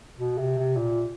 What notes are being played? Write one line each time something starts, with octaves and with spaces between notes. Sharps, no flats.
B2
C3
C3
A#2